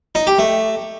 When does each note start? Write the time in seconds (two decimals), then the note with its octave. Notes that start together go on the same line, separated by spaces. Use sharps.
0.15 D#4
0.27 G4
0.39 A3